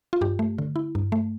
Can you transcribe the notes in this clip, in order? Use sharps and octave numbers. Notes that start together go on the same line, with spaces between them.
F4
G2 G4
A3
D3
E4
G2
A3